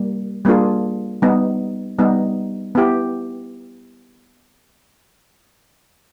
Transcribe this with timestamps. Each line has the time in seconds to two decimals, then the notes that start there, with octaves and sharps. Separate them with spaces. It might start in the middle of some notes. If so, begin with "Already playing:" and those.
Already playing: G3 A#3
0.45 G3 A#3 D4 F4 G#4
1.22 G3 B3 D#4
1.99 G3 B3 D#4
2.75 B3 E4 G4